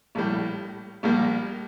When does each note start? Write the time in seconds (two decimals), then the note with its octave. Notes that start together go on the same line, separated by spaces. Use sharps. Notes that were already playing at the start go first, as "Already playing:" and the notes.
0.15 A#1 A2 G3
1.03 A#1 A#2 G3 A#3